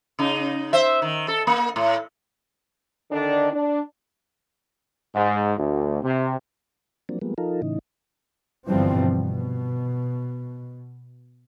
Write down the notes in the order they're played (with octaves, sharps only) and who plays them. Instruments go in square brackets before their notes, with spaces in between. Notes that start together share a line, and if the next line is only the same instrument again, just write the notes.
[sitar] C#3 D#4
C5 E5
D#3
A4
A#3
A2
[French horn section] D3 D#3 D4
D4
[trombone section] G#2
D2
C3
[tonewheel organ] F3 F#3 A#3 C4 D4
F3 G3 G#3 A#3 B3
F3 D#4 F4 A4 A#4
A2 C#3 E3 D#4
[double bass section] G1 G2 E3 F3 G3 C4
B2